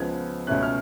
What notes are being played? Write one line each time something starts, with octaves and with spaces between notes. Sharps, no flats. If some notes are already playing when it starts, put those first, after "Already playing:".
Already playing: C#2 C#3 F3 B3 G#6
C#2 B2 A3 C#4 F#6
F6